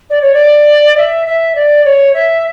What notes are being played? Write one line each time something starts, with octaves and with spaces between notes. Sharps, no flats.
D5
C#5
D5
E5
E5
D5
C#5
E5